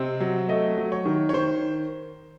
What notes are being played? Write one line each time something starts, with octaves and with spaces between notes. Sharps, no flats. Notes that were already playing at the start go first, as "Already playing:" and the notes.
Already playing: C3 C4 D#5
F#3
A3 D#5
F#3
C#5
D#3
C#5
D#3 C5